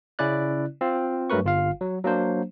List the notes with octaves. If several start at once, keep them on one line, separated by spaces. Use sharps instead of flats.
C#3 C#4 E4 D5 F#6
C4 F4
G2 F#3 A3 A#4 B4 C#6
G1 F4 F5
F#3
F#3 A#3 D4 C5